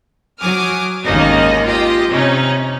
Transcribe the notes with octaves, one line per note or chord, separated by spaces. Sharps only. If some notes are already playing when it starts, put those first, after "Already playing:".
F#3 G#5 D6 D#6 F6
G#1 D#2 A#3 C#4 D#4 D#5
F4 G4 D#5
C3 C#4 D#4